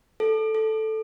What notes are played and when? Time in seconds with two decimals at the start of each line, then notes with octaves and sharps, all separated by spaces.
0.20 A4
0.55 A4